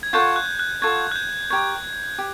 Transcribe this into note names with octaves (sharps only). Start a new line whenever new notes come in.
G#6
F4 A4 C#5 F#5 G6
F#6
F#6
F4 A4 C#5 F#5 G#6
F#6
G6
G4 A#4 C#5 G#6
G4